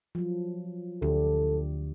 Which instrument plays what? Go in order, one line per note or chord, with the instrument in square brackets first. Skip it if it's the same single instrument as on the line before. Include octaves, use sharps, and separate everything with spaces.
[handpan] F3 F#3
[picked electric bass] D2 [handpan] D4 G4 [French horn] A4